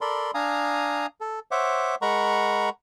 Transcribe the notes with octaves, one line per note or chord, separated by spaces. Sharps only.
A4 A#4 D5 B5 C6
D4 F5 G#5 A#5 D#6
A4
C5 C#5 E5 F#5 D6
G#3 A#4 F#5 A#5 B5 C#6